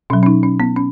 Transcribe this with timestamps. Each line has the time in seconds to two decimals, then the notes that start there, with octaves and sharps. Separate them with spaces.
0.10 B2 F#3 C#4
0.23 C#4
0.26 D#4
0.43 C#4
0.60 B3
0.76 C#4